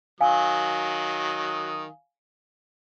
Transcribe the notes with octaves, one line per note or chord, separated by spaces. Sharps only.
D#3 F#3 F5 G#5 D#6